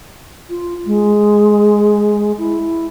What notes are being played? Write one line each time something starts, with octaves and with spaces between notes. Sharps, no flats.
F4
G#3
E4